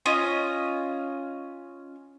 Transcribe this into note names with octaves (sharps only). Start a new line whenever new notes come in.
C#4 F4 D#5